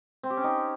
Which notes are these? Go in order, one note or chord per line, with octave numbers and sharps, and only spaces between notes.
C4
G4
C#4
D#4